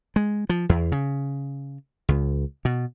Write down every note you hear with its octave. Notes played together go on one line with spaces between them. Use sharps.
G#3
F3
E2
C#3
C#2
B2